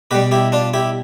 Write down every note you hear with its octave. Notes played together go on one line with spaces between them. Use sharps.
B2 G3 G4 B4
E4 G4
D4 F4
E4 G4